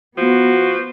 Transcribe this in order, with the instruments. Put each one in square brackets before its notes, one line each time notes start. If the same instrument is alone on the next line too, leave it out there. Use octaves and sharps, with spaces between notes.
[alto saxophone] F3 [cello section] B3 [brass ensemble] F#4